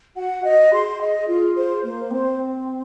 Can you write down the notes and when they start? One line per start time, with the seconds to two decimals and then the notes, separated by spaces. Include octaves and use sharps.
0.16 F#4 F#5
0.44 F#4 D#5
0.72 G#4 C6
1.00 D#5
1.27 F4
1.56 C5
1.83 A#3 C5
2.11 C4 C5